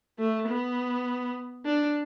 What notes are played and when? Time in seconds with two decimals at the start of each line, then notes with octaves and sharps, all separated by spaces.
0.19 A3
0.48 B3
1.65 D4